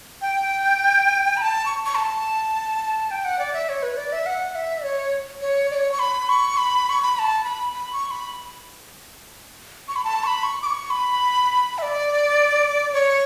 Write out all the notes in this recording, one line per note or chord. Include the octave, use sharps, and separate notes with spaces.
G5
B5
A5
C#6
C#6
A5
G5
F#5
D5
E5
C#5
B4
D5
E5
F#5
E5
C#5
C#5
D5
C#5
C#6
B5
C#6
B5
C#6
B5
B5
A5
B5
B5
C#6
B5
C#6
B5
A5
C#6
B5
C#6
D6
C#6
B5
E5
D5
C#5